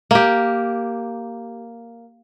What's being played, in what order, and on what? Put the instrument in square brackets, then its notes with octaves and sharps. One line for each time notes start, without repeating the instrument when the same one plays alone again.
[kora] A#3 G4